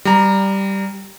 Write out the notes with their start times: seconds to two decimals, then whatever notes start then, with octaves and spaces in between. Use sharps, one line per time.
0.05 G3 A#5